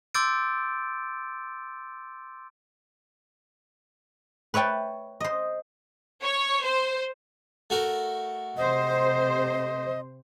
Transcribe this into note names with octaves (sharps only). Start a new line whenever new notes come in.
C6 D6 E6 G6 A6 D7
B4 C#5 E5 G5 A5
C5 D#5
C#5
C5
A3 F#4 A#4
C3 C5 D#5